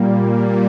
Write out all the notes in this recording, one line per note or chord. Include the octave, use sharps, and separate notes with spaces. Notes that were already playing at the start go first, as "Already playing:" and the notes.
Already playing: A#2 G3 A#3